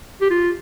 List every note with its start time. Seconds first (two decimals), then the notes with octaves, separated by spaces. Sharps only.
0.21 G4
0.30 F4